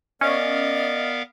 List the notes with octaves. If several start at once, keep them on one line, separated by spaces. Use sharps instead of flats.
B3 C#4 A#4 D5 D#5 F5